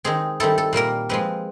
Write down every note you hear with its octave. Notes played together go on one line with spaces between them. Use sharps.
D#3 G#3 C4 G#4
D#3 G3 C4 E4 A4
A4
A#2 G3 A#3 A#4
F3 G#3 C4 B4